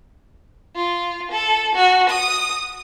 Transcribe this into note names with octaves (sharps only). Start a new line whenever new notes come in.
F4
A4
F#4
D#6